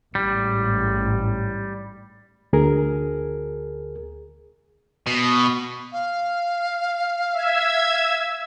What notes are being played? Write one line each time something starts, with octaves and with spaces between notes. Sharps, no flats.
A1 G#2 G3
D2 G#4 A#4
B2
F5
E5 E6 G#6